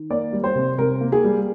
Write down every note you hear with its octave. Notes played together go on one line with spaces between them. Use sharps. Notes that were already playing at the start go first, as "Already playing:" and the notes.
Already playing: D#3
A#3 D5
G3
C5
C3
C3 A#4
A#3
G#4
G3